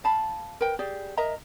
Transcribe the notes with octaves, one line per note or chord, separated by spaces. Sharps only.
F5 A5 B5
A#4 B4 G5
G4 G#4 D5 F5
A#4 D#5 E5 A#5